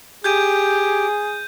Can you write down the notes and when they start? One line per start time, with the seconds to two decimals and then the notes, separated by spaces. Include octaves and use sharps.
0.24 G4 G#4 G6 G#6 D#7